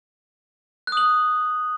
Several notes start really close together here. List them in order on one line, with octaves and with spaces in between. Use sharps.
F#6 D#6 F#7